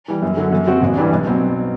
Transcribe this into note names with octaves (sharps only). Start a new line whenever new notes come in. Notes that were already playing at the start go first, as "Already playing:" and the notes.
E3 G3
F#2
D3 F#3
F#2
F#3 C4 F#4
A1
G2 E3 G3 D4
B1
B2 F#3 C4